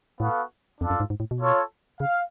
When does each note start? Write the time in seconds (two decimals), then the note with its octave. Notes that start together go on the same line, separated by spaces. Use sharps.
0.20 A2 B3 F#4 A4 F5
0.81 F2 D4 F4 A4
0.90 F#2
1.00 G#2
1.10 G#2
1.20 A2
1.31 B2
1.41 F4 A4 C#5
2.00 C#3 F5